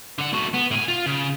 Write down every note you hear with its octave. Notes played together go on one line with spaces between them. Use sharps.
D3 F#5
A2 F#4
B3
A2 G#5
F4
C#3